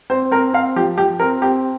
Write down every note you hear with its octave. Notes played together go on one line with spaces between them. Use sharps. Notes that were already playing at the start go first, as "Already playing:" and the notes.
C4 C5
C4 A#4
C4 F5
F3 G4
F3 G4
C4 A#4
C4 G4